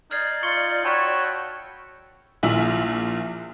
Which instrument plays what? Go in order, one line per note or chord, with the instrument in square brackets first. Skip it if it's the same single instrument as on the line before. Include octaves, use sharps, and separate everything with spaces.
[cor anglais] D#4 [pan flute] D5 [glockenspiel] F6 G#6 C7
[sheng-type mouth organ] F4 [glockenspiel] C#6 C#7 G7
[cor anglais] F#4 [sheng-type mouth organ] C#5 G5 E6 [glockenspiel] A5 B5 B6
[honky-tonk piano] A#1 A#2 E4 E5 F#7